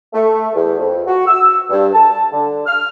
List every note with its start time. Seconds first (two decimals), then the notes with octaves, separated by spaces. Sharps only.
0.14 A3
0.54 E2
0.80 F2
1.07 F#4
1.27 E6
1.70 G2
1.94 A5
2.33 D3
2.66 F6